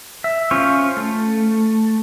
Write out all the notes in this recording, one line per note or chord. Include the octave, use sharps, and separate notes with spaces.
E5
C#4 F4 C5 F5 C#6
A3